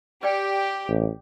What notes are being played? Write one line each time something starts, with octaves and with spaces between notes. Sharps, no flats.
G4 B4 D5 G5
A1